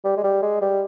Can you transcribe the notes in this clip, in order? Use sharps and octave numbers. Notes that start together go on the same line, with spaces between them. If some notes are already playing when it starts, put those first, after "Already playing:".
G3
G#3
G3
G#3
G3